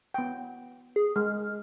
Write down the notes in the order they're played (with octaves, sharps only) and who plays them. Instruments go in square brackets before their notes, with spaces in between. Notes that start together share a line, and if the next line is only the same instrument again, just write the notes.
[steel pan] B3 G5
[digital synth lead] G#4
[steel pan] G#3 [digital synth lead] F6